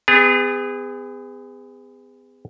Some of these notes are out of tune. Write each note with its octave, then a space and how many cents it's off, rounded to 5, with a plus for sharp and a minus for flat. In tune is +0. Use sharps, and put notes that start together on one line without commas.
B3 +35 G#4 -30